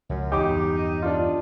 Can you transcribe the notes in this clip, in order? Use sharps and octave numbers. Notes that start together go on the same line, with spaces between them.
C#2 F#2 F3
E2 G2 D#4 G4 D6
D4 F4